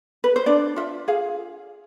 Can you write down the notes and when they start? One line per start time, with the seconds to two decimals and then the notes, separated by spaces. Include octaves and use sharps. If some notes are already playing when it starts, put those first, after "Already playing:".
0.24 B4
0.36 C5
0.46 D4 D5
0.76 F4 E5
1.08 G#4 F5